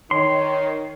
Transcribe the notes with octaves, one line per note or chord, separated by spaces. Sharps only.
D#3 C#5 C6